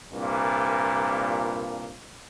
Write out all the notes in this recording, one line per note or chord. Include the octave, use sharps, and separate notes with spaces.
C2 G2 A#2